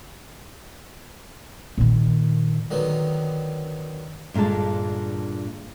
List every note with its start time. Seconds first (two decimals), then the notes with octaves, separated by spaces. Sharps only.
1.78 A#2 D#3
2.71 D3 D#3 F#3 B3
4.34 G2 A#2 D3 G#3 A5